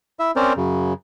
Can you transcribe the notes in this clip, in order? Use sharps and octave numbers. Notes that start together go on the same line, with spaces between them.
E4 E5
C4 C#4 A#4 C5 D5
F#2 C#3